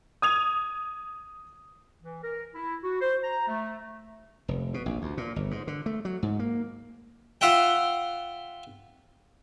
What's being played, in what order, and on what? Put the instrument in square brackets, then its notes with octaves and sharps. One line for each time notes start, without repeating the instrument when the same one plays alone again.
[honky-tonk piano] D#6 G#6 F7
[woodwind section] E3
A#4
E4
F#4
C5
A#5
A3
[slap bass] F1
B2
A#1
D2
A#2
G1
G#2
D3
A3
F#3
G#2
A#3
[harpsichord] F4 E5 F#5 G5